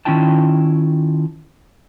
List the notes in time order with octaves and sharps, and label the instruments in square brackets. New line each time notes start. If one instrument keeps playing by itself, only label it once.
[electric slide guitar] D#3 C#4 E4 F4 G5 A5